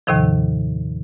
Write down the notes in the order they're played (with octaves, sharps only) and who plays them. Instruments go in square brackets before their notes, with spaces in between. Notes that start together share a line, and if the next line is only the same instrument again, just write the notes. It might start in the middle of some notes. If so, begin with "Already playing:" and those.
[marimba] D#2 A2 C3 D#3 F3